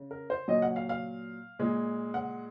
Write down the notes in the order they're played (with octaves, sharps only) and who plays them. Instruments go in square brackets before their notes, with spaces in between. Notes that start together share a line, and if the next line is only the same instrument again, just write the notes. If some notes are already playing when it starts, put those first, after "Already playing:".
Already playing: [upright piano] C#3
A#4
C5
A#2 F#3 D#5
F#5
F5
F5
A#2 G#3
F#5